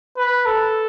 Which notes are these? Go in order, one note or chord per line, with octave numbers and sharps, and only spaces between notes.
B4
A4